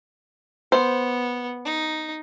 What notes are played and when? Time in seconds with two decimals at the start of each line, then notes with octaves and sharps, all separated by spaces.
0.72 B3 C5
1.65 D#4